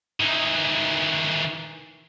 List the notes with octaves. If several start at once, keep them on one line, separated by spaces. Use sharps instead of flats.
D#3 E3